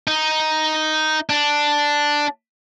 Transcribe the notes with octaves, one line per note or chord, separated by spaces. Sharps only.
D#4
D4